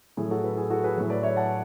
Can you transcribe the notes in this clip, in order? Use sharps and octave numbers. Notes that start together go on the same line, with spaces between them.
A2 F#3 G#4
F#4 A4
G#4 B4
G#4
F#4 A4
G#4 B4
A2 F#3
B4 D5
C#5 E5
F#5 A5